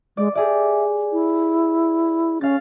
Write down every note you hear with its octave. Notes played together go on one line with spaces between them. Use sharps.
G#3 D5
G4 G#4 D5 E5
E4
C#4 F5 A6